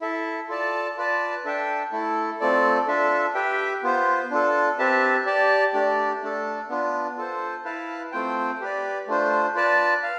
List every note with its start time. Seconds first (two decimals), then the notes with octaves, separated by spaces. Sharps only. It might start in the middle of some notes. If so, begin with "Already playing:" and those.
0.01 E4 A4 E5
0.49 F4 A4 D5 A5
0.97 F4 B4 D5 A5
1.45 D4 A4 E5 G5
1.92 A3 E4 A4
2.40 A3 C4 F4 A4 D5
2.87 D4 F4 A4 E5
3.35 G4 B4 E5 G5
3.83 B3 F4 C5
4.31 D4 F4 A4
4.79 C4 G4 B4 E5 A5
5.26 G4 D5 A5
5.73 A3 D4 G4 D5
6.22 A3 D4 A4
6.69 B3 D4 F4
7.17 F4 A4 C5
7.65 E4 B4 F5 A5
8.12 A3 C4 F4 C5 G5
8.61 G4 B4 D5
9.08 A3 D4 F4 C5
9.55 F4 B4 D5 A5
10.03 F5